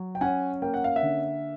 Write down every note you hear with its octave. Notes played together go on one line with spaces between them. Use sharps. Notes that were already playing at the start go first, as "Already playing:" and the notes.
Already playing: F#3
G5
C#4 F#5 G#5
A#3 G5
F#5
F5
E5 F#5
D3